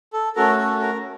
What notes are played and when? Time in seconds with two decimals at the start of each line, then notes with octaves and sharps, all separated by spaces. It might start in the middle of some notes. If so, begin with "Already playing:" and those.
0.13 A4
0.36 A3 C#4 F#4 A4 A#4
0.59 A4
0.81 A#4